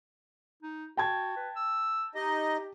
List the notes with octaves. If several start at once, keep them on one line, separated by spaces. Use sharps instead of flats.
D#4
F#4 G5 A5 G#6
B4
E6
D#4 G4 D#5